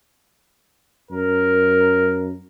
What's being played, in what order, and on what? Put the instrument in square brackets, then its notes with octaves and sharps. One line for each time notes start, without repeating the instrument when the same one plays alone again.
[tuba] F#2 [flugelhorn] A#4